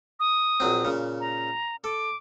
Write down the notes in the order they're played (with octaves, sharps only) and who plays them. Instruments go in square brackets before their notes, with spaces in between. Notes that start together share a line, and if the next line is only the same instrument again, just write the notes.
[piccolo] D#6
[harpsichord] A#1 F#3 C4
A#2 C#3
[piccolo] A#5
[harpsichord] A4 [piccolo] D6